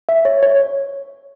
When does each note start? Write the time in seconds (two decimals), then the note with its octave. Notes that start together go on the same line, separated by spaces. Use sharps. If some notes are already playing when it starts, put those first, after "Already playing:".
0.09 E5
0.25 C#5
0.43 C#5